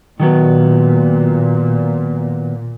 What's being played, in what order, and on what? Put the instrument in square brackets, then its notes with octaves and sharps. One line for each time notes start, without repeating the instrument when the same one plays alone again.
[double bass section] A#2 [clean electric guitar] D#3 F#3 B3